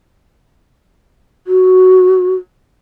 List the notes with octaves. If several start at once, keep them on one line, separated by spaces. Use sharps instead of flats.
F#4